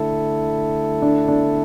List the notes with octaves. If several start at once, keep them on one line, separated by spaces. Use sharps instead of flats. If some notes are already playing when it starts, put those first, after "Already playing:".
Already playing: D3 A3 E4 A4
D4
D4